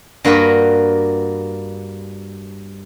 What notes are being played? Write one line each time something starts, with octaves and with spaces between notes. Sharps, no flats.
G2 A#3 F#4 A#4 B4 B5